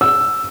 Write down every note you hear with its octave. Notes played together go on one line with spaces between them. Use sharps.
E6